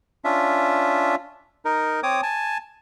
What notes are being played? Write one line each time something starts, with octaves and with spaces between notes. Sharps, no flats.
C#4 D4 F4 E5
D#4 A#4
C4 C#5 D6 D#6
G#5 A5